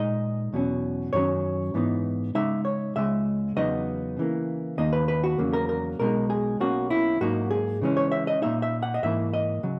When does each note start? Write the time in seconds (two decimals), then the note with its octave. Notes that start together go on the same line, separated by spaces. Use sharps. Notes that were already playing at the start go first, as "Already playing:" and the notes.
Already playing: A#2 G#3 D#4 D#5
0.53 E2 B2 F#3 C#4
1.13 F#2 D#3 F#3 C#4 C#5
1.74 G#2 E3 B3 D#4
2.35 C#3 G#3 D#4 E5
2.65 C#5
2.95 C#2 C#3 G#3 E5
3.56 E2 C#3 F#3 B3 D#4 D#5
4.17 C#3 E3 A#3
4.78 D#2 D#3 A#3 D#4 D#5
4.93 B4
5.08 B4
5.24 F#4
5.38 E2 C#3 F#3 A#3
5.53 A#4
5.69 A#4
5.99 B1 B2 G#3 D#4 A#4
6.30 G#4
6.60 B1 B2 A#3 C#4 F#4
6.90 E4
7.21 G#2 F#3 A#3 D#4 F#4
7.50 G#4
7.82 C#3 E3 G#3 C#4
7.97 C#5
8.12 E5
8.27 D#5
8.42 A#2 A#3 D#4 E5
8.62 E5
8.83 F#5
8.94 D#5
9.03 G#2 E3 A#3 E4 E5
9.34 D#5
9.63 C#3 F#3